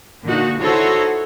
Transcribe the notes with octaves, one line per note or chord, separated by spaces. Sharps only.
A#2 D3 D#4 F#4
D#4 E4 F#4 A4 C5 C#5